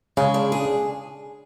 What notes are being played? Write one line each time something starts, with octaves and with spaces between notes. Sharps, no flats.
C#3 G#3
D4
G#4